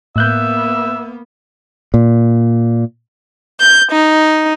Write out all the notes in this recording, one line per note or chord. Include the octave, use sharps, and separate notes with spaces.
A2 A#3 B3 E5 F#6 G6
A#2
G6
D#4